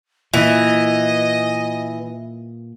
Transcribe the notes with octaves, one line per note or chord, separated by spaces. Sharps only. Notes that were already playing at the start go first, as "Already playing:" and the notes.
A#2 E3 D#5